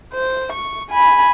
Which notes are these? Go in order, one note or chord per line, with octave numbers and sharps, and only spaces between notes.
C5
C#6
G#5 B5